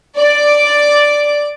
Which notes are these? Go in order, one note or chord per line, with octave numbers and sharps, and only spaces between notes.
D5 D6